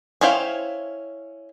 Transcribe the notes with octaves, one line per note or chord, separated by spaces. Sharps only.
C#4 E4 C5 F5 G5